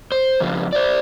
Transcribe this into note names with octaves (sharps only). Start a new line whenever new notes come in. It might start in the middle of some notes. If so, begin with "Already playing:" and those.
C5
F2 C#3 F3
C5 D5